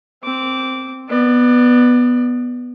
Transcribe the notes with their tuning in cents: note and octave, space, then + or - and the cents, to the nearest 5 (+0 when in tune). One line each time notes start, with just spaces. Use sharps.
C4 +0 D6 -15
B3 +0 D5 +25